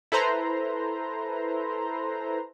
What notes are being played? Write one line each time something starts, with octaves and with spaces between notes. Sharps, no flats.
E4 A4 B4 C5 A#5 C6